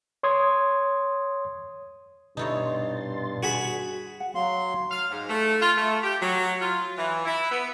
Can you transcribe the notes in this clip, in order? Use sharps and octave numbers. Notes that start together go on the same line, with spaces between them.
C#5 C6 D#6 G#6
G2 B2 D#4 E4 C#5 C6 A6
F#4 G#4 B5
F#5
F#3 F5 A#5 C6
F5
G#2
A3
F4
A3
G4
F#3
F4
E3
E4
B3